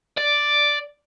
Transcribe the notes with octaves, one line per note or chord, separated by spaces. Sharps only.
D5